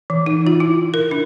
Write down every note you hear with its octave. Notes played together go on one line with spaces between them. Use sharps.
E3
D#4
F4
E4
A#4
D4